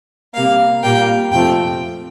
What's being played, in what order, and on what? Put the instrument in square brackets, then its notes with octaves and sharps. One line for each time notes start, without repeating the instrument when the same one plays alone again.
[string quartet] C3 G3 A#3 F5
A#2 G3 A#3 G5
F2 C3 F3 A3 G5